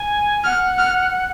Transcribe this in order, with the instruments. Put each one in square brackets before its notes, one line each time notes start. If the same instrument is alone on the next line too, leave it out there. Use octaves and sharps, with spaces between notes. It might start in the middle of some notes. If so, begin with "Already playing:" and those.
Already playing: [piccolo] G#5
[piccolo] F#5 [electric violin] F6
[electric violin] F6